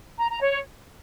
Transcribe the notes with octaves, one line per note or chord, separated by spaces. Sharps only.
A#5
A#5
C#5